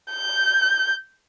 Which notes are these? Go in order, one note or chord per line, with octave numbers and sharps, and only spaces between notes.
G6